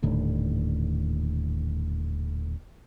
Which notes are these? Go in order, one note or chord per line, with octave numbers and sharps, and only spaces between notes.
D#1 D#2 A2 D3